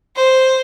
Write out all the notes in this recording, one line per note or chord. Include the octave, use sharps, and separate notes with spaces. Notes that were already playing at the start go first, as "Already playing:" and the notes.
C5